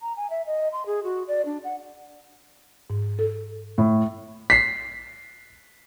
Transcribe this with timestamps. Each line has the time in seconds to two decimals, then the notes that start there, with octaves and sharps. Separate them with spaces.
0.02 A#5
0.17 G#5
0.30 E5
0.46 D#5
0.73 C6
0.86 G#4
1.04 F#4
1.28 D5
1.45 D4
1.64 F#5
2.90 G#2
3.19 A4
3.78 A2
4.50 B6 C7